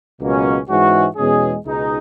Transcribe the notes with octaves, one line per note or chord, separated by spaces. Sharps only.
C#2 B2 F#3 A#3 C#4
G#2 E3 G#3 C#4 F#4
E2 B2 G#3 C#4 G#4
C#2 B2 G#3 D#4